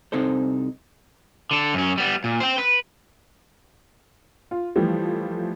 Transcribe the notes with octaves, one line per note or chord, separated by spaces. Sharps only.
C2 C3 C4 D#4 A4 C5
D3 A4
F#2 C#4
G3 B3
A#2
C5 G5
B4
F4
E3 F3 G3 A3